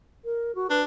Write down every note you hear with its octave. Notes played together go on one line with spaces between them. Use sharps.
A#4
F#4
D4 B4